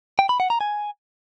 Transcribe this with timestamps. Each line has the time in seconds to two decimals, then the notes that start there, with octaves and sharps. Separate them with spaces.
0.19 G5
0.29 B5
0.40 F#5
0.50 A#5
0.61 G#5